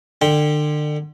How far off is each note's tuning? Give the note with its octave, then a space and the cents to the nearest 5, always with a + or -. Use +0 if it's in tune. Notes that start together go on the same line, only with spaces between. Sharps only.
D3 +30 G5 +0